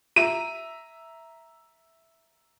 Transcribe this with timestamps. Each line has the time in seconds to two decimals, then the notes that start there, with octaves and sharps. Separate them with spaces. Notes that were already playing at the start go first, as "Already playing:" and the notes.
0.16 E5 A#5 D#7